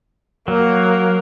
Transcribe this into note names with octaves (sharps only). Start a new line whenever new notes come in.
F#3 A#3